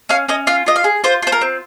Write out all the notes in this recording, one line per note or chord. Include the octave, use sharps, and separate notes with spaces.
C#4 F5
C#4 D#5
F4 F5
F4 D#5
F5
G#4
F4 C5
F4 C5
A#4
C4